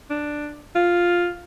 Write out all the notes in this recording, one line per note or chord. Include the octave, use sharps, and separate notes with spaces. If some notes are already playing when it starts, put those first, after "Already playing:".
D4
F4